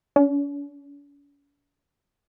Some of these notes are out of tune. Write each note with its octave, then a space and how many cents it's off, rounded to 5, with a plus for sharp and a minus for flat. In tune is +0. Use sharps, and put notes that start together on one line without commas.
C#4 +45